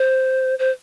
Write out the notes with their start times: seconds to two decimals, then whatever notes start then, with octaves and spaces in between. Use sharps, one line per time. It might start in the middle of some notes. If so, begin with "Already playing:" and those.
Already playing: C5
0.59 C5